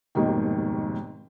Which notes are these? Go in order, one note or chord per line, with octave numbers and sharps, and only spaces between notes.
F1 D#2 G#2 B2 D#3